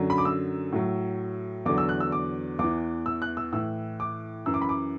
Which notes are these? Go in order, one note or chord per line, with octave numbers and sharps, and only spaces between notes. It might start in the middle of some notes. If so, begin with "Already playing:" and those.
Already playing: F#2 D3 F#3
B5
D6
E6
A2 F#3
E2 D3 F#3 D6
E6
F#6
E6
D6
E2 E3 D6
E6
F#6
E6
A2 E3 E6
D6
F#2 E3 E6
D6
B5
D6